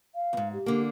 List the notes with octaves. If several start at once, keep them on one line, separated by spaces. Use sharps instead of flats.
F5
E2 G#2
G4
D3 A#3